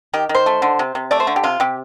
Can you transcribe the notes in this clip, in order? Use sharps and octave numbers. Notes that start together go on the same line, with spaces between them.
D#3 G4
D#3
C5
A3
D3
C3
C3
A3 D5
C5
D3
G4
C3 F4
C3 G4